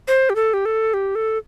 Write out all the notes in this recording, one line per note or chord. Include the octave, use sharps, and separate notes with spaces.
C5
G4
A4
G4
A4
G4
A4